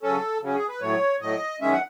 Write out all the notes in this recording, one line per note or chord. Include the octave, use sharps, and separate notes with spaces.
C#3 F#3 C#4 A4
C#3 F#3 C#4
G#4
B4
A2 F#3 A3 C#5
A2 F#3 A3 D#5
F#2 D#3 G#3 C#4 E5
F#5